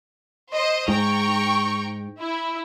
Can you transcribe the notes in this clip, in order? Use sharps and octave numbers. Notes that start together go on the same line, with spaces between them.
C5 D#5
G#2 G5 A#5 C#6
E4